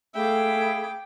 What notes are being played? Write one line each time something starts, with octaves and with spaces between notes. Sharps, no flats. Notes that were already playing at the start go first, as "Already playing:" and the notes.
A3 G#4 E5 F5 G5 B5 D6